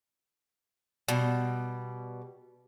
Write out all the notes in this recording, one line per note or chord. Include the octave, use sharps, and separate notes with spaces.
B2 G3